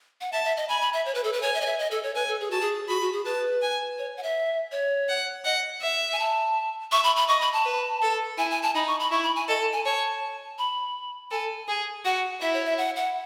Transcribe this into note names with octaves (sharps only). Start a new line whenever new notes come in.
F#5
E5 A5
E5
D#5
G#5 B5
B5
E5
C#5
B4
A4
B4
C#5 G#5
E5
D#5
E5
D#5
A4
C#5
B4 G#5
A4
G#4
F#4 A5
G#4
F#4 B5
F#4
G#4
B4 A5
G#5
C#5
F#5
E5
C#5
F#5
D#5 F#5
E5
G#5
A5
E5 C#6
B5
B5
D#5 C#6
B5
A5
B4
A4
E4 G#5
G#5
A5
D#4 B5
C#6
B5
E4 C#6
B5
G#5
A4 D#5
G#5
C#5 A5
B5
A4 G#5
G#4
F#4 F#5
E4 E5
C#5
E5
F#5
F#5